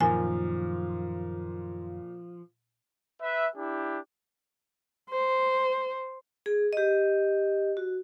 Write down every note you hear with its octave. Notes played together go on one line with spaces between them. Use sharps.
F#2 A#2 D#3 F3 G#5
B4 E5
D4 E4 G4
C5
G#4
G4 D#5
F#4